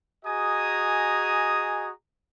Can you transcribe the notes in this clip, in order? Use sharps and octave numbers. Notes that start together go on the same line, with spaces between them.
F#4 G#4 D#5 G#5 A#5 D#6